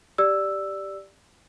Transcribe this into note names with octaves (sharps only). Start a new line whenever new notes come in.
G4 D5 E6